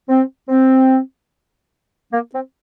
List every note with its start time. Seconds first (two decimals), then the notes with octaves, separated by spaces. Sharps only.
0.09 C4
0.49 C4
2.13 A#3
2.34 C4